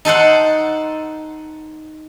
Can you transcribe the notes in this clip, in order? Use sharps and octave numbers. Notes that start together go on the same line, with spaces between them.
D#4 A4 C5 F#5